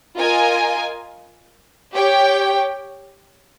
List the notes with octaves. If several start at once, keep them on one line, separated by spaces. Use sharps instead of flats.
F4 A#4 D#5 G#5
G4 C#5 G5